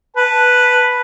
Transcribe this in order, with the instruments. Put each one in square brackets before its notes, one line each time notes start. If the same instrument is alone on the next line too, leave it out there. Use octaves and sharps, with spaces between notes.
[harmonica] B4 A5